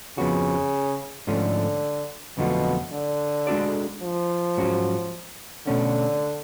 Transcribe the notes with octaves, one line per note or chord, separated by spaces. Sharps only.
F2 C#3 F3 B3 F#4
G#2 D3 F3 A3 C#4
F2 B2 D3 F#3 A3 F4
D3
G#3 D4 F#4 A4 D5
F3
G#2 F#3 C#4 F#4
B2 D3 A3 C#4